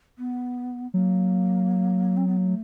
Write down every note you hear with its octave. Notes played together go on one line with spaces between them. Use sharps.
B3
F#3 A#3
C4
B3
A#3
A3